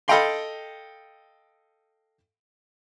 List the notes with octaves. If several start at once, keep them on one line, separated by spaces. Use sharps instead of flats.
A4 D#5 F5 G5 B5 C6